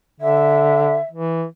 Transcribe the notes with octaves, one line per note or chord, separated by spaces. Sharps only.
D3 E5
E3